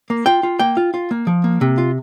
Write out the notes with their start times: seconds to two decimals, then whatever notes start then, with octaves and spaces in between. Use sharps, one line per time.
0.10 A#3
0.26 F4 G5
0.43 F4
0.59 A#3 G5
0.77 F4
0.94 F4
1.11 A#3
1.27 F3
1.44 A#3
1.61 C3
1.78 F4